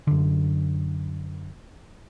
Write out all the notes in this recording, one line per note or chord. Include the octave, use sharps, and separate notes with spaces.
F#2 D3